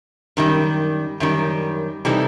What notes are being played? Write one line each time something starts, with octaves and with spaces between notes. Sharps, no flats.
F#2 D#3 G3
F#2 D#3 G3
C3 E3 G3 D#4 A4